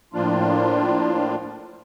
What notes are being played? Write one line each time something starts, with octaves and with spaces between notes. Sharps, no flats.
A2 F3 A#3 D4 F4